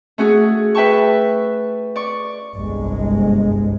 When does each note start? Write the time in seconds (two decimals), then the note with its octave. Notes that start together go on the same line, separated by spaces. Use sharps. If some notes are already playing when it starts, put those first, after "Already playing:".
0.18 A3 C#4 F#4 G#4
0.75 B4 E5 G5 A5 C#6
1.96 D5 C#6
2.55 G1 C2 G#3